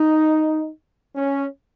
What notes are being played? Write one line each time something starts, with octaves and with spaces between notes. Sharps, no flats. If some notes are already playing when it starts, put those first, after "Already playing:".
Already playing: D#4
C#4